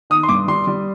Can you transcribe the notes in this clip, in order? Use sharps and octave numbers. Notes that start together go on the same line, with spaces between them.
D#3 D#6
C6
G2 D6
G3 C6
G3